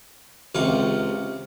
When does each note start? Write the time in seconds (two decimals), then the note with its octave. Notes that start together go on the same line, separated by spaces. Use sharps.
0.55 C#2 C3 F5 C#6